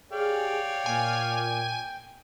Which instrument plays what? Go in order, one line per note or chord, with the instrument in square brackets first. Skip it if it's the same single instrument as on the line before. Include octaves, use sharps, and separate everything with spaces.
[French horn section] G4 G#4 [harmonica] C#5 D5 F5 [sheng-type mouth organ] G5
[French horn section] A#2 [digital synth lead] G#5